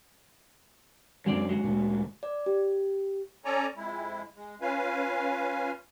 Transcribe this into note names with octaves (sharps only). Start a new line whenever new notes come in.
F#2 D3 F#3 G#3 C4 D5
G#3 F#4
D2 A#2
D5
G4
C#4 A4 C#5 D5 G#5 A#5
F2 G#3 E4
G#3
C#4 F4 B4 F5 G#5